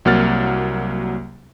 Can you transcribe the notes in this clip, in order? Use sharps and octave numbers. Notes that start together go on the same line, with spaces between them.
C2 F#3 A#3 F#5 F6 A6